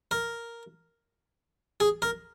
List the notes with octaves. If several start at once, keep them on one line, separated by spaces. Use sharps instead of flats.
A#4
G#4
A#4